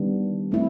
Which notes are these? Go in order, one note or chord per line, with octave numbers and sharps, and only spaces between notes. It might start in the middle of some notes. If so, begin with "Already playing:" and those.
Already playing: D#3 G3 B3 D4
A3 C4 E4